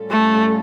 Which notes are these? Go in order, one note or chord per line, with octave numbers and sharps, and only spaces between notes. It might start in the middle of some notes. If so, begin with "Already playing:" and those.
Already playing: A2 G3 C#4 F4 A4
A3